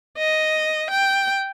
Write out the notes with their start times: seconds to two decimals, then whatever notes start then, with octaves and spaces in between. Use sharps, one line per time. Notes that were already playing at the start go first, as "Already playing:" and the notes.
0.18 D#5
0.90 G5